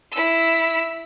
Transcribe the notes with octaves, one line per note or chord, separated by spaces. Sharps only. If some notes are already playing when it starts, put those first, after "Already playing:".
E4 E6